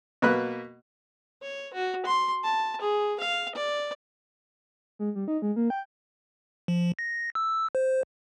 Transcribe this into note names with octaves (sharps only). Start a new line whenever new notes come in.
B2 A#3 B4 F#6
C#5
F#4
C6
A5
G#4
F5
D5
G#3
G3
D#4
G#3
A#3
G5
F3
A#6
E6
C5